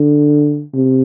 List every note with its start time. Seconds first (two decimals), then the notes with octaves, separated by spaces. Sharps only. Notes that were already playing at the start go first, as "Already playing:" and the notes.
Already playing: D3
0.74 C3